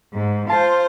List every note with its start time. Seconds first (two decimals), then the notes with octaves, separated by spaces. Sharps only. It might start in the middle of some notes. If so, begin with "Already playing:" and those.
0.14 G#2
0.49 F4 C5 A5